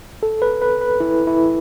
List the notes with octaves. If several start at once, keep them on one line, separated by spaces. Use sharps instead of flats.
A4
B4
B4
B4
E4
E4